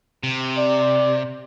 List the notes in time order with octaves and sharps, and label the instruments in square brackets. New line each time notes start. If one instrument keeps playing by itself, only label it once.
[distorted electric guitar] C3
[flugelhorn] D5